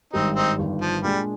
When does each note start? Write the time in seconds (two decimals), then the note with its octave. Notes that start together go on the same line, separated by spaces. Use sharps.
0.13 G#1 G2 D#3 G3 C4 D#4
0.36 C4 D#4
0.59 G1 G2 D#3
0.82 F3
1.03 A#2 G3 G#3 D4 G#4